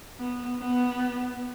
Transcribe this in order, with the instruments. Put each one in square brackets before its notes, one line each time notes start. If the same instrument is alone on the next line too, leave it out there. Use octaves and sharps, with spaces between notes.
[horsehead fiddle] B3
B3